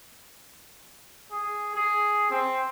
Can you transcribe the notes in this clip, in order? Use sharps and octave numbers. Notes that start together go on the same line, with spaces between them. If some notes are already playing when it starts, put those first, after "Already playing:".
G#4
G#4
C4